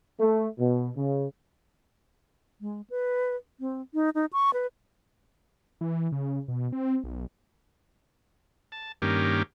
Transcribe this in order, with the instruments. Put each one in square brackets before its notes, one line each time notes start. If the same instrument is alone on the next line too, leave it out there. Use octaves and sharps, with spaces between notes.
[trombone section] A3
B2
C#3
[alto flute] G#3
B4
C4
D#4
D#4
C#6
B4
[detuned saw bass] E3
C#3
B2
C4
B1
[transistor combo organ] A5
G2 D#3 A#3 C#4 G4